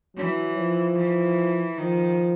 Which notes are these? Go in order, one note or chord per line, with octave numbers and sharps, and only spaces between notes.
E3 F#3
F3
E3
D#3 F3